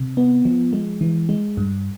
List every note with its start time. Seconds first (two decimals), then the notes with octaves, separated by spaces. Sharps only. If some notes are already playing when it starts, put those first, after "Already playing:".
Already playing: C3
0.17 B3
0.45 F3
0.73 G#3
1.01 E3
1.29 G#3
1.57 G2